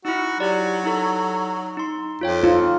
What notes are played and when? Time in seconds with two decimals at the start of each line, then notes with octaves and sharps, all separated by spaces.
0.05 D#4 E4 F#4
0.40 F#3 E4 G4 D5
0.84 D#4 A4
1.77 D#4 C6
2.21 F2 F4 C#5 G5
2.44 D#4 F4